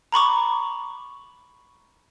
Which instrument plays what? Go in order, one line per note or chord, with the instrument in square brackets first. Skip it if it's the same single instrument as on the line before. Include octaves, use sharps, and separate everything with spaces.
[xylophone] A#5 B5 C#6 D6